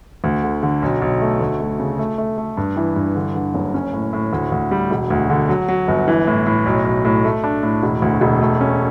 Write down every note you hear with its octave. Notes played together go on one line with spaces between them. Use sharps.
D2
D3
D3
B1
B1
A3
D2
A3
C#3
A3
A3
A3
G2
E3
G2
D3
D3
F#1
C#4
A2
A2
D2
D2
G3
E1
D2
D3
F#3
F#3
G1
E3
A2
A2
B1
B1
A2
A3
D4
A2
E1
D2
E1
A3
C#4